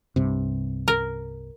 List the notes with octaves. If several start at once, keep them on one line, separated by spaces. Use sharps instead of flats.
C2 G2 C3
A#4